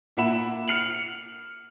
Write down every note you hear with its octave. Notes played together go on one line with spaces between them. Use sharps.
A#2 A#3 E5 F#5 B5 E7
F6 C#7 F7 F#7